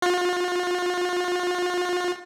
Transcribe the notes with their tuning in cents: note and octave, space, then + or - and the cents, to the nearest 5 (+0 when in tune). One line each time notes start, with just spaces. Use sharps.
F4 +40